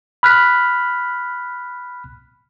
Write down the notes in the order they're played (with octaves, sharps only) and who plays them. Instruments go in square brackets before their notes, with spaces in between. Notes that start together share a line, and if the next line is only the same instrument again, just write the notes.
[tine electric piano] B5 F6 F#6 B6